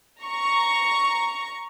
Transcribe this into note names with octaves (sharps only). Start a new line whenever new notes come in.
A#5 C#6